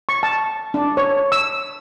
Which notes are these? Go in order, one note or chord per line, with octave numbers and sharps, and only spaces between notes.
C#6
A5
D4
C#5
E6